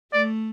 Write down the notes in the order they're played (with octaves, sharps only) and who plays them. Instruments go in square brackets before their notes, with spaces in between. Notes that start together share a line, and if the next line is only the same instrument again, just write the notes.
[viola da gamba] A3 [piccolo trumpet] D5